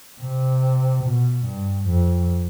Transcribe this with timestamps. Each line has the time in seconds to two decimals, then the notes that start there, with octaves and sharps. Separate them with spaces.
0.21 C3
1.04 B2
1.46 G2
1.87 F2